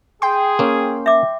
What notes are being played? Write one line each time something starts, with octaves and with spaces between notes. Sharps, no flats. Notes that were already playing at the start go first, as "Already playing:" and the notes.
G#4 G5 C6
A#3 C#4
E5 D6